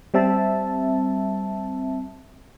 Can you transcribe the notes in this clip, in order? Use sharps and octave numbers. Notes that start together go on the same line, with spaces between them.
G3 C4 E5 A5